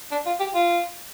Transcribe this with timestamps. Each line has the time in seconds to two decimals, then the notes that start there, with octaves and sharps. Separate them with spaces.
0.11 D4
0.26 F4
0.40 G4
0.54 F4